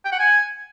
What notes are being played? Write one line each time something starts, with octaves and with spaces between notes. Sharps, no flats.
G5
F#5
G#5